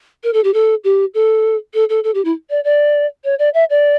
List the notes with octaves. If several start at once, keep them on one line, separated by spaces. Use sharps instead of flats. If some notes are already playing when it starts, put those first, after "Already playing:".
A#4
A4
G4
A4
G4
A4
A4
A4
A4
G4
E4
D5
D5
C#5
D5
E5
D5